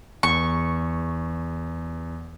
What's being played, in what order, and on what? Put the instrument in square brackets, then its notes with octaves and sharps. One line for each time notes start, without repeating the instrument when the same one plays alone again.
[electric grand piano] E2 [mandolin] C#6